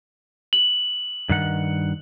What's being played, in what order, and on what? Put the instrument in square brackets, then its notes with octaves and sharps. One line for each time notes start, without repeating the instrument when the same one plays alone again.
[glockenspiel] F#7
[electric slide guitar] G2 D#3 F#5